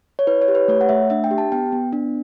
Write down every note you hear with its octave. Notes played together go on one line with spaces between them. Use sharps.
C#5
E4 B4
C#5
G4
B4
A3 C#5
F#5
A3 E5
D4 E5
G5
G4
A5
B3 G5
B3
D4